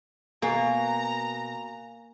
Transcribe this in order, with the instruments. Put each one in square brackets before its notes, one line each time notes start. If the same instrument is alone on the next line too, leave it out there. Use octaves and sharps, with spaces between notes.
[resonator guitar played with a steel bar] B2 [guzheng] A#3 [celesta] F5 G#5 [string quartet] A#5